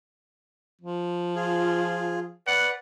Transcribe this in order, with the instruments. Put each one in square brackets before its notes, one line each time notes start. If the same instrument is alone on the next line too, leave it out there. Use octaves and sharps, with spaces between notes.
[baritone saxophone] F3
[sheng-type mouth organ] F4 G#4
[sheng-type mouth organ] B4 D5 [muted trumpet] F#5